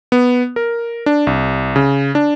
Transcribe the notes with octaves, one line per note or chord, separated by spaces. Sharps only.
B3
A#4
D4
C2
C#3
D4